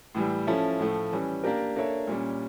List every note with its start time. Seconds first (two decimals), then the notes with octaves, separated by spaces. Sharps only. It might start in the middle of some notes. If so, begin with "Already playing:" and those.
0.15 A2 E3 G3
0.47 F3 C#4 E4 A4
0.80 A2 F3 A3
1.12 E3 G3 C#4
1.44 A#3 D4 G4 A#4
1.76 A#3 D4 A4 C#5 E5
2.08 A#2 G3 C#4